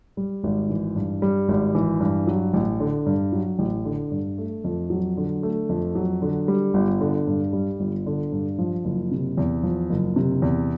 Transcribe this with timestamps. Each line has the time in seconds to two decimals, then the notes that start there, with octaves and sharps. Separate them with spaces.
0.17 G3
0.43 G#1
0.69 E3
0.96 G2
1.22 G3
1.49 G#1
1.75 E3
2.00 G2
2.27 F#3
2.54 A1
2.80 D3
3.06 G2
3.32 F#3
3.59 A1
3.85 D3
4.12 G2
4.38 A3
4.64 F2
4.90 F#3
5.17 D3
5.43 A3
5.69 F2
5.95 F#3
6.22 D3
6.48 G3
6.74 G1
7.01 D3
7.27 G2
7.53 G3
7.80 G1
8.06 D3
8.32 G2
8.58 F3
8.85 F#1
9.12 C3
9.38 E2
9.63 F3
9.90 F#1
10.16 C3
10.42 E2